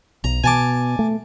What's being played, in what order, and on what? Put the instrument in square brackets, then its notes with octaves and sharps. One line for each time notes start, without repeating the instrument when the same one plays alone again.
[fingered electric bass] B1 [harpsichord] A#5
[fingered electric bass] B2 [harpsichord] G#5 A5 D6
[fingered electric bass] A3